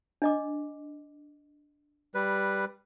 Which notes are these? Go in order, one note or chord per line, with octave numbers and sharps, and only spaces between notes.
D4 D#5 D6
G3 B4